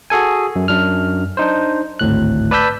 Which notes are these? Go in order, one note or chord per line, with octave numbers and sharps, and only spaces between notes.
F#4 G#4 A4 G#5
F#2
F#2 D4 F6
D4 D#4 C5
G#1 D2 A2 F#6
B4 D5 A5 E6 G6 B6